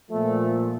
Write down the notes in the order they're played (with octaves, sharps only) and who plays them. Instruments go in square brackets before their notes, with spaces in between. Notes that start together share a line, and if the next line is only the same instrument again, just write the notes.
[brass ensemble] A#2 F3 A3